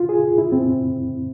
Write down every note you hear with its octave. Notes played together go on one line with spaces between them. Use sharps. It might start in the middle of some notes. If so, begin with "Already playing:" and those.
Already playing: F4
G#4
E4
C4